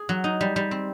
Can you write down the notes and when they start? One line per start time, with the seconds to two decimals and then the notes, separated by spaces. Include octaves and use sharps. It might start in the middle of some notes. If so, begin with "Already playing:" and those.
Already playing: G#4
0.09 F#3
0.24 D#4
0.41 G3
0.56 G3
0.71 C4